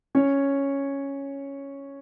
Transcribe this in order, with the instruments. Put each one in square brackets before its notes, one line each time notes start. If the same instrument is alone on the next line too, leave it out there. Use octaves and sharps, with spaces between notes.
[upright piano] C#4 C#5